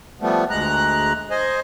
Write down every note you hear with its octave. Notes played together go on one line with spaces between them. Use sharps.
F3 G3 A3 B3
D2 G#3 A#5 F#6
C5 D#5 G#5